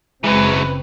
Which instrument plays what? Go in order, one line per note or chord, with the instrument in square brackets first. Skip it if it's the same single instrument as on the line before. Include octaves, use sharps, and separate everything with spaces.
[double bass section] F#1 C#3 C4 [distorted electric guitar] E3 F#3 [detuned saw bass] G#3 [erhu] B4